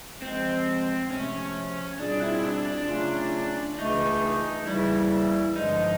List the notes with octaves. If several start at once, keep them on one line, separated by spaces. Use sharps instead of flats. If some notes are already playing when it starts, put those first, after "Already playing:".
C#3 F3 G#3 C4
C3 F3 A3 C#4
B2 G3 C4 D4 F4 G#4
E4
D4
D4
C#3 F#3 A3 C#4 F4
C#2 C#3 E3 A3 D4 D#4
D#2 C#3 E3 G3 E4
G2 D3 F3 G#3 D#4